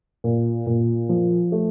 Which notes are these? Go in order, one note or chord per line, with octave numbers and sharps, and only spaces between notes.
A#2
A#2
F3
A3